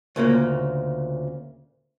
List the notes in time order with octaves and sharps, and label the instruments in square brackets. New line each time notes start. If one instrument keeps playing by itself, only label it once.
[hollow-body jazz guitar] D2 A#2 C#3 A#3